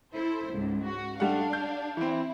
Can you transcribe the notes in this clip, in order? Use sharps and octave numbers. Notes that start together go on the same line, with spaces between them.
E4 A4 C5
C#2 G#2
F#4
G3 A3 D4 F5 F#5
G6
E3 C4 E4